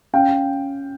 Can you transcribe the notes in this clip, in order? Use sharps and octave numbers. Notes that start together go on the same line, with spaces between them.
C#4 F5 G5